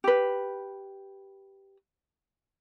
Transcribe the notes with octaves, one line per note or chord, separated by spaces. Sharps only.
G4 B4